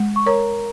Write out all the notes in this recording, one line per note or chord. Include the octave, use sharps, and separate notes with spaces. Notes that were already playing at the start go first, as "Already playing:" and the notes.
Already playing: G#3
C#6
A#4 C#5 A#5